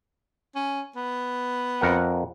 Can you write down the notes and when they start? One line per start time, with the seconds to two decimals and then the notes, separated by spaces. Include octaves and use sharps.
0.55 C#4
0.96 B3
1.81 F2 A#4 F#5